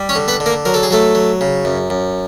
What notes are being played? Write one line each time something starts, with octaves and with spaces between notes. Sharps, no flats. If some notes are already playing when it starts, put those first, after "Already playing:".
Already playing: G3
C#4 C#5
D3
B3 B4
D3
A#3 A#4
F#3 A#4
A4
G#4
F#3 A3 A4
F#3
C#3
F#2
F#2